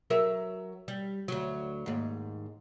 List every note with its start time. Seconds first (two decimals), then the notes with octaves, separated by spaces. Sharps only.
0.10 F#3 A#4 E5
0.88 G3
1.28 D2 F#3
1.86 D#2 G#2